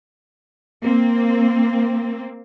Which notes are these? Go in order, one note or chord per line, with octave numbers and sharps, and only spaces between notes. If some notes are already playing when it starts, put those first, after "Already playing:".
A#3 C4